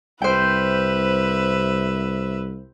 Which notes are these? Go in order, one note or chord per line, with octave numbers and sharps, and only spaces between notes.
C2 B4 C5 E5 G5